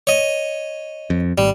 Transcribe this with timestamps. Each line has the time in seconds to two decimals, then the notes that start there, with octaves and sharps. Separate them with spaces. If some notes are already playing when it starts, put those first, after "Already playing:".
0.07 C#5 D#5
1.10 F2
1.38 G#1 G3